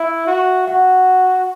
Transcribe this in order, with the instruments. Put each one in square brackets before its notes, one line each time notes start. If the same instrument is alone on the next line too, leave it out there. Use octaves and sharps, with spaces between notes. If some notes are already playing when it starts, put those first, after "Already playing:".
Already playing: [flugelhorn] E4 [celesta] E5
[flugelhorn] F#4
[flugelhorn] F#4 [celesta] F#5